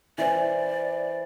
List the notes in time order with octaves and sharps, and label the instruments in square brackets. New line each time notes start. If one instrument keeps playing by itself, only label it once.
[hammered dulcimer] E3 C5 [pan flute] D5